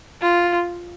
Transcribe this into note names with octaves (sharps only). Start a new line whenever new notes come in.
F4